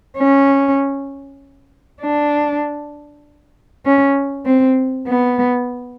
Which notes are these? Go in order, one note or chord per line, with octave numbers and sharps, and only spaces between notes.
C#4
D4
C#4
C4
B3